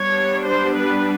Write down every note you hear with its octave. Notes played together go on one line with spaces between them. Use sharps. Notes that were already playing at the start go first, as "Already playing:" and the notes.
Already playing: G3 B3 D4 C#5
C5
B4